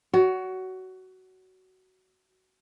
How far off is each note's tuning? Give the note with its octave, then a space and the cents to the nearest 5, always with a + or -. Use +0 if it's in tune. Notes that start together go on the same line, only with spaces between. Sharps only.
F#4 +15 C#5 +40